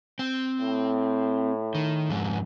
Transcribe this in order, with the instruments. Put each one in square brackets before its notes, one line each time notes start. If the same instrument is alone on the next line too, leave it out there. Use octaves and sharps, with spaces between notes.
[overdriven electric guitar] C4
[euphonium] A2
[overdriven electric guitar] D#3
F2 G#2